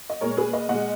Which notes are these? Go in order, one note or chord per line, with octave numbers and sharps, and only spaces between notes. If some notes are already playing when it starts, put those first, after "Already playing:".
D#5
A#2 G#3 A#4 C#5
G#4 B4
B4 D#5
A#2 G#3 D#5 F#5